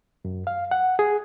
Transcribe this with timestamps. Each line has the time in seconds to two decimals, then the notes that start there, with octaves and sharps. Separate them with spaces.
0.25 F#2
0.47 F5
0.71 F#5
0.99 G#4